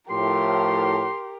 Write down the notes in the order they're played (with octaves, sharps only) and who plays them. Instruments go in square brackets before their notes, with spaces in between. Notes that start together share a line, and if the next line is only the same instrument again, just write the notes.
[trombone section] A2 F3 [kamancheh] G4 A#4 [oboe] C6